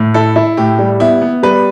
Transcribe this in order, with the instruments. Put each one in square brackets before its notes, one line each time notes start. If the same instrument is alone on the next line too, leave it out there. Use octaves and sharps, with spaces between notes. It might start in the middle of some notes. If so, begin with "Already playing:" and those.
Already playing: [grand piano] A2
[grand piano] E4 [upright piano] A4
[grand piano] E4
[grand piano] A2 [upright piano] G4
[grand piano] G3
[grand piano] B3 [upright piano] E4
[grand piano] B3
[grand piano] G3 [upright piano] B4